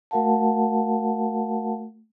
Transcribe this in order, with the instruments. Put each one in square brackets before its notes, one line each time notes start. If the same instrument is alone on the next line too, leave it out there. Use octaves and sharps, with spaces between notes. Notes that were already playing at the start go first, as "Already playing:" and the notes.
[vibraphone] A3 F#4 A#4 F5 F#5 A5